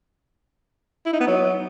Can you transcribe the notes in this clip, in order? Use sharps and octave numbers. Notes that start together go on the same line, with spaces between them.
E4
D#4
B3
F#3